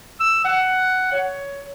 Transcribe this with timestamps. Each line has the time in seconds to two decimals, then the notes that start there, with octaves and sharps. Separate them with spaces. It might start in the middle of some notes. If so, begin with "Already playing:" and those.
0.20 E6
0.45 F#5
1.12 C#5